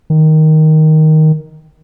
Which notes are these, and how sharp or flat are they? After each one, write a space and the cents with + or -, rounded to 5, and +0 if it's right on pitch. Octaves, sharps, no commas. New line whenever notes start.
D#3 +5